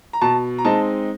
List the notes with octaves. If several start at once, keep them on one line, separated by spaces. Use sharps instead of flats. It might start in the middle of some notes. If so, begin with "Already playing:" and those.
A#5
B2 A5
A#5
G#3 C4 D#4 A5